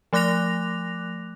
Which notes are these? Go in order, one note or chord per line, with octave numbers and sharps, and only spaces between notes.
F3 A3 D6 F#6 A#6 F7